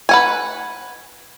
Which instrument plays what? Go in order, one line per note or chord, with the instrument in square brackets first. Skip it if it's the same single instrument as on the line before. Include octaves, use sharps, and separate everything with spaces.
[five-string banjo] B4 F#5 G#5